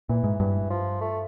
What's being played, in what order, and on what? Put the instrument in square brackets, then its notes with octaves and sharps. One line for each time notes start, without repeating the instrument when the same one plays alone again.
[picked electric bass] A#2 [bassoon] E3
[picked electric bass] G#2
[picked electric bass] G2 [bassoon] E3
[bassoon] F3
A3